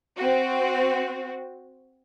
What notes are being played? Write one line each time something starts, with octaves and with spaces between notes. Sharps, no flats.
C4 F#4